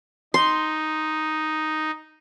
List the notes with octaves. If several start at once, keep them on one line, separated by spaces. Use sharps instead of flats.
D#4 C6